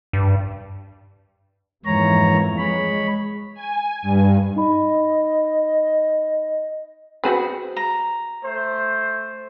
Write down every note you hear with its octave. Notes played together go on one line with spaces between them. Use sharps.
G2
F2 G#2 E3 A#3 C#5 A#5
G#3 C#5 B5
G#5
G2
D#4 D#5 B5
C4 F#4 G#4 B4
A#5
A3 C5